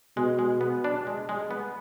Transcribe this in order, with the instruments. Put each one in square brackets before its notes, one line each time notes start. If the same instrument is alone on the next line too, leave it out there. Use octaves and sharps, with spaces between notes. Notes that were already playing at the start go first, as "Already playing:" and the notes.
[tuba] B2 [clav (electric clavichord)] G#3
[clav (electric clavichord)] G#3
B3
D4
G#3
G#3
B3